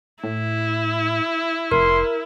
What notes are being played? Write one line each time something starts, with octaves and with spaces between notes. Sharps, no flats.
A2 E4
F1 A#4 C6